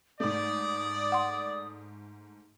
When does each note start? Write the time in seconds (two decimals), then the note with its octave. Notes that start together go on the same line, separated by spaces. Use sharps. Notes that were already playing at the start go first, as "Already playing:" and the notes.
0.20 G#2 A3 D5 D#6
1.12 F#5 C6